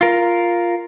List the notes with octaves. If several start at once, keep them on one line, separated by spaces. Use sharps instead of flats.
F4 A#4